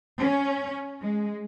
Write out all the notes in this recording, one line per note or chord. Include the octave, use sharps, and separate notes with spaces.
C#4
G#3